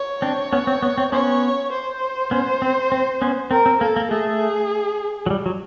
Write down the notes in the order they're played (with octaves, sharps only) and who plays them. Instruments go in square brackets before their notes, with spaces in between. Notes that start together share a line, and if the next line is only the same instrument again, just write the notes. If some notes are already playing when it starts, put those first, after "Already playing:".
Already playing: [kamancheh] C#5
[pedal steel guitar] C4 D4
B3 C#4
C4
B3
C4
[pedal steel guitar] B3 C#4 [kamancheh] C#5
[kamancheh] C5
[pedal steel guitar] B3 C#4
C4
C4
B3 C#4
[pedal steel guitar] C4 [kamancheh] A#4
[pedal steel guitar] C4
[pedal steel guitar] A#3 [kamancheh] A4
[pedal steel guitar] A#3
[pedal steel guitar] A3 [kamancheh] G#4
[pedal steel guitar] F#3
G3
F#3